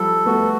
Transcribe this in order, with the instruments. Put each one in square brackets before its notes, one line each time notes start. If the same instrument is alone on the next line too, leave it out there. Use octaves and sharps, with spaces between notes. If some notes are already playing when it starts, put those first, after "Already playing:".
Already playing: [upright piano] F3 G3 [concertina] A4
[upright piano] A3 B3 [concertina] F#4